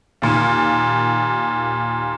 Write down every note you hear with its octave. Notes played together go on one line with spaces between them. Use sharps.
D#2 A#2